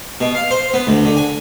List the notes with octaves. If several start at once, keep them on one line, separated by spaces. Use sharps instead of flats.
B2
F5
C5
B3
D2
D3
G#5